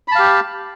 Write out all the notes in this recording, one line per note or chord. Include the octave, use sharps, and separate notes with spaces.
G4 F5 A5 B5